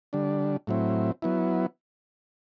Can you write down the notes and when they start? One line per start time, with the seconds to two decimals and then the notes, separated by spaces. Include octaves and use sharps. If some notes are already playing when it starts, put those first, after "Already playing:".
0.13 D3 G3 D4
0.67 A2 F#3 C4 E4
1.22 F#3 B3 E4